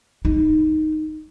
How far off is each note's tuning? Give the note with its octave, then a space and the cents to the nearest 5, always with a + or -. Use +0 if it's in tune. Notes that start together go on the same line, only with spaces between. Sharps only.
D#4 -5